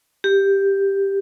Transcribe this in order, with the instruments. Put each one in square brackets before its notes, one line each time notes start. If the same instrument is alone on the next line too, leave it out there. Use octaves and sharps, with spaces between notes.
[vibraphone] G4